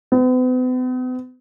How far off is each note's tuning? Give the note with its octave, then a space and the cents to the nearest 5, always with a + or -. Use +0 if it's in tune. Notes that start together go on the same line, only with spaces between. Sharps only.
B3 +45